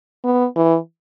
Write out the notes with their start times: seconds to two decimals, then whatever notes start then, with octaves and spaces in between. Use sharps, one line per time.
0.24 B3
0.56 E3